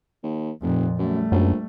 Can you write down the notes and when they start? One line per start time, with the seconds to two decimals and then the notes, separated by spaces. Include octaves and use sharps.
0.23 D#2
0.62 F1 F2 A#2
0.99 F#2 G3 A3
1.32 A#1 F#2